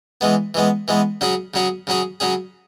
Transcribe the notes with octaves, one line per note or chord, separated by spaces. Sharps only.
E3 G#3 B3
E3 G#3 B3
E3 G#3 B3
C#3 F#3 C#4 G#4
C#3 F#3 C#4 G#4
C#3 F#3 C#4 G#4
C#3 F#3 C#4 G#4